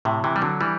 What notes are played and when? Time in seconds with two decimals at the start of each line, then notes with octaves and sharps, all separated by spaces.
0.05 A2 C3
0.24 C3 E3
0.36 G3
0.42 D3 F#3
0.61 E3 G3